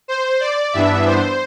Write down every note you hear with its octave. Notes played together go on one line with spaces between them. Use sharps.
C5
D5
G2 E3 B3 D4 E5
C5